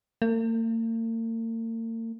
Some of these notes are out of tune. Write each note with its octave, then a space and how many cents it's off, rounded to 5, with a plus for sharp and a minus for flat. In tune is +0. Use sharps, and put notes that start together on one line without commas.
A#3 -45